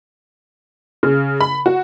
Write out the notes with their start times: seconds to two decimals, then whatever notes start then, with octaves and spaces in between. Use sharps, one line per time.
1.03 C#3
1.41 B5
1.66 F#4